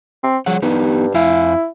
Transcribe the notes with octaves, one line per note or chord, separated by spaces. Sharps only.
C4
C#3 F3 G3 F#5
G2 B3 D#4 G4
F2 E4 F5 G#5